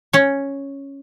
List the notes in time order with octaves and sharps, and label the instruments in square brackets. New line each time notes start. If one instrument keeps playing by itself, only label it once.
[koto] C#4 C#5